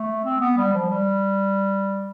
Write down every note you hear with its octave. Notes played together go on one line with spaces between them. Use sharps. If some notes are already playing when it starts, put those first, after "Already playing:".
Already playing: A3
C4
B3
G3
F3
G3